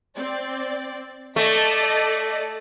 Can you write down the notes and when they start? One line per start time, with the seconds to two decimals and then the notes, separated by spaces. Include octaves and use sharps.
0.15 C4 D5
1.36 A3 A4 D5 D#5